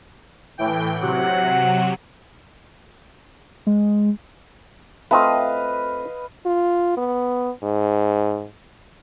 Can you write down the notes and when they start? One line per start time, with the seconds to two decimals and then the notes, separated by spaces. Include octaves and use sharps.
0.58 A2 E3 G5
1.01 C3 F#3 F#5
3.67 G#3
5.11 A3 C4 F4 B4 D#5 F5
6.46 F4
6.97 B3
7.63 G#2